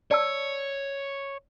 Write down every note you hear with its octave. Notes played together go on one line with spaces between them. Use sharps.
C#5 D5 A5 E6